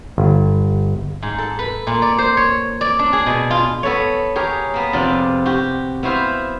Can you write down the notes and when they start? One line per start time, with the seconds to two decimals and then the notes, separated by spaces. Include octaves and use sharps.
0.18 G1
1.22 G#2
1.38 A4
1.59 B4
1.87 A#2
2.02 D5
2.18 C5
2.37 C#5
2.81 D5
2.99 D4
3.13 G#4
3.26 B2
3.50 F4
3.83 B3 A4 B4 C#5
4.35 G4 G#4 A#4 C#5
4.74 A#3 B3 B4
4.93 F2 C3 B3 F4 D5 A#5
5.46 F#4 G4
6.03 B3 E4 F#4 C5 E5 F5